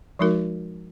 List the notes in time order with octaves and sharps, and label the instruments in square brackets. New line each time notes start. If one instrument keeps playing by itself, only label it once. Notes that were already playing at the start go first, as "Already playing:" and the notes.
[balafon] F3 G#3 D#4 F#4 A#4